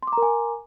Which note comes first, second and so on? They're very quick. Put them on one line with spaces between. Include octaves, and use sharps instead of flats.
C6 D6 A#5 A#4 G#5